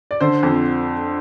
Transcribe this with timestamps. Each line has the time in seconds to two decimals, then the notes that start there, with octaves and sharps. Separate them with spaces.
0.11 D5
0.21 D3 C5
0.43 F2